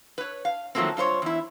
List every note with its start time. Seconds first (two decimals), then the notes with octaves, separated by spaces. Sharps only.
0.18 B4 C#5
0.45 F5
0.75 D#3 F3 F#3 A3 A#3 C4
0.97 G2 F4 C5 C#5
1.22 E2 E4